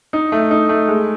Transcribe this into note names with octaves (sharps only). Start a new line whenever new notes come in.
D#4
A3
D#4
A3
G#3